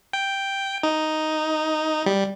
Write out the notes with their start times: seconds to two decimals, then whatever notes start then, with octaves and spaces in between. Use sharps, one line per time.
0.13 G5
0.83 D#4
2.06 G3